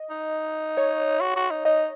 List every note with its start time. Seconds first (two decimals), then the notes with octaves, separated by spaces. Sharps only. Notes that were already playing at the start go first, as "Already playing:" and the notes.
Already playing: D#5
0.10 D#4
0.77 C#5
1.21 F#4
1.36 F#4
1.50 D#4
1.65 D#4 D#5